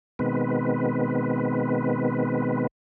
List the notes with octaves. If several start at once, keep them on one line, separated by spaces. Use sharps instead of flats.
B2 D#3 G#3 B3 C4 B4